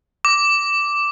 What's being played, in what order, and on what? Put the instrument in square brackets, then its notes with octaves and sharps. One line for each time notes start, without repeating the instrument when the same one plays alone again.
[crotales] D6